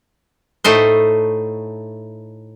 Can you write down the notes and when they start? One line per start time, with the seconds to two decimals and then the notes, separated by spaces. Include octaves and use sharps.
0.64 A2 A3 D#4 C5